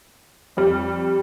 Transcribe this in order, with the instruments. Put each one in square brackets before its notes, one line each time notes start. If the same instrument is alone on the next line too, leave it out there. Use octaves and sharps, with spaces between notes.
[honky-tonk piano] F2 G3